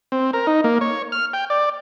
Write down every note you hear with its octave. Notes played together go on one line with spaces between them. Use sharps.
C4
A#4
D#4
A#3
C#5
F6
G5
D5